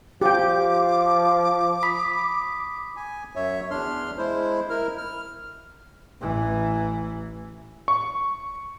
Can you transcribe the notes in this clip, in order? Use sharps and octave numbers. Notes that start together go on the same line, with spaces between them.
F3 G4 G5 D6
B5 D#6 B6
G#5
F#2 C#5 E5
E2 D4 C6 F6
G#3 E4 C5
E4 A#4 F6
F6
A1 E3
C#6